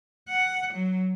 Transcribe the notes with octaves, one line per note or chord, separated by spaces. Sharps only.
F#5
F#3